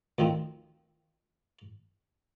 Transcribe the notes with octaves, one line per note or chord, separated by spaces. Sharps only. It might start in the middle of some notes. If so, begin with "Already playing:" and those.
D2 D#3 F3 C4